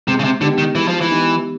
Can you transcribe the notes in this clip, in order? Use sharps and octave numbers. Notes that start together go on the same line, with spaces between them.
C3 G#3
C#3
C3
D3 B3 D#4 G4
D#3
E3 G#3
F3
E3
B3 D#4 G4